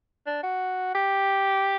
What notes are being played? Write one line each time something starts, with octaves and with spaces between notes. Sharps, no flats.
D4
F#4
G4